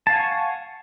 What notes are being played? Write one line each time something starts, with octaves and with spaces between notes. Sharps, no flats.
F5 F#5 G#5 A5 C#6